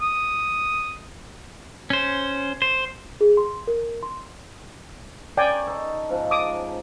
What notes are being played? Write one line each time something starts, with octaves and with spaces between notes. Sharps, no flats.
D#6
C#4 C5
C5
G#4
C6
A#4
C6
C#4 A#4 C#5 D5 G5 G#5
D#4 A4 C#5
G#2 C#3 F3
D6 D#6